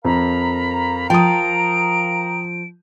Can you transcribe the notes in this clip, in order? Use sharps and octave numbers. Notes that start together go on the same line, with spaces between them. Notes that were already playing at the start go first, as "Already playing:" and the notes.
F2 A#4 F5 A#5 B5
F3 G5 D#6 D7